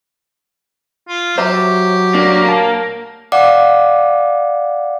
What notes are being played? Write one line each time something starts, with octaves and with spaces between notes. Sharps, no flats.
F4
F#3 G4 C5 E5 A#5
A#3 D4
A#2 A5
D5 F5 F#5 D6